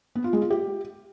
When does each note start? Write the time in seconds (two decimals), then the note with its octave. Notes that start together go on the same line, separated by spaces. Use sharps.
0.15 B3
0.24 F4
0.33 G#3
0.42 F4
0.50 G4